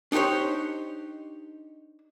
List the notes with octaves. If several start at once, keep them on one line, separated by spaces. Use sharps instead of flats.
D4 D#4 G4 C5 C#5